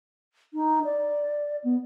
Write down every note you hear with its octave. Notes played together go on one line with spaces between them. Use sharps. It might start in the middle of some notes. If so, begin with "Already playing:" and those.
D#4
D5
B3